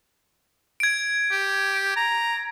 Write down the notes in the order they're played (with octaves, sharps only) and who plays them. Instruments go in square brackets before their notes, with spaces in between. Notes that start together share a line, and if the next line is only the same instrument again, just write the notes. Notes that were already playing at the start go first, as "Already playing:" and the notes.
[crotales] G#6 D7
[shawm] G4
A#5